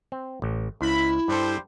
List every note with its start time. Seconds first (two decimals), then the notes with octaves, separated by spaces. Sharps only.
0.12 C4
0.42 A1
0.81 C#2 E4 B5
1.28 G2 G3 A4 C5